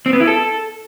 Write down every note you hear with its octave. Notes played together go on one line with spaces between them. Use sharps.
C4
B3
E4
A4